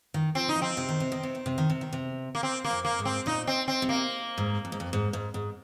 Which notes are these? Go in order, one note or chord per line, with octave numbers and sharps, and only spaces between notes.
D#3
F3 C4
D#4
F3
C4
C3
D#3
C3
D#3
C3
D#3
C3
D#3
C3
D#3
C3
A#3
C4
A#3
F2
A#3
G#2
C4
A#2 D#4
C4
C4
C3
A#3
G#2
F2
G#2
F2
G#2
G#2
G#2